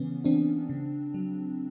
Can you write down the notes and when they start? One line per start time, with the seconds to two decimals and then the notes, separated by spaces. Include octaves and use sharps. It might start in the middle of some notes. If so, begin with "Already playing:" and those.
Already playing: C#3 E3 B3 C#4
0.24 E3 C4 D4
0.69 C#3
1.14 F#3